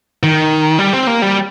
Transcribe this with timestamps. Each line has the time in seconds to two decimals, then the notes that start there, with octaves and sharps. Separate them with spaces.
0.23 D#3
0.79 G3
0.93 C4
1.07 A#3
1.22 G3